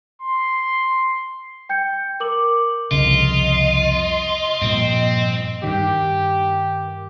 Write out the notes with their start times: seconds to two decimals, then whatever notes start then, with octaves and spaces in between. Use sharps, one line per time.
0.21 C6
1.69 G5 G6 C#7
2.20 A#4 D6 F#7
2.91 C2 F2 C#3 F4 D#5
4.62 G2 A#2 F3 C4
5.63 G2 D#3 G4